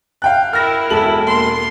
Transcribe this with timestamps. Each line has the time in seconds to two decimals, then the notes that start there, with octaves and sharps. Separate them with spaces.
0.22 F5 G5 F#6
0.53 E4 A#4 F6 A#6
0.90 E1 E4 A4 F#7
1.24 A#3 C6